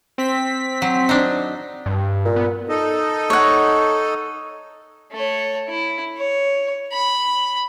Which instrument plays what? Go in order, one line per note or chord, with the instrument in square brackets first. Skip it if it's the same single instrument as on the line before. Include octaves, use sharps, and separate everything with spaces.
[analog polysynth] C4 B6
[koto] F#3
D4 D#4
[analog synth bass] G2
[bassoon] A#2
[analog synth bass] B3
[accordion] D#4 A4 D#5
[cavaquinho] C#5 F#5
[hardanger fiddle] A3 C#5
E4
C#5
B5